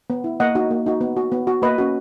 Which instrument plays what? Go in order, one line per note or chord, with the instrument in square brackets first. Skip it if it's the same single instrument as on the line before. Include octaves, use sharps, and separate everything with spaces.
[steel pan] B3
E4
A#3 D#5 F#5
D#4 F#4
A#3
D#4 F#4
B3
F#4
B3
F#4
A#3 B4 D#5
C#4 F#4